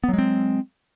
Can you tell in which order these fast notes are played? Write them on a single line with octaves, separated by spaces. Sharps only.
B3 F#3 G#3 C4